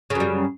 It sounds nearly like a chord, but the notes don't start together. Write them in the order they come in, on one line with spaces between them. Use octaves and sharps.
C#3 F#2 G3